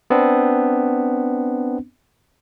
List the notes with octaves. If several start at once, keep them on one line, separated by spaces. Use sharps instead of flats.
B3 C4 D4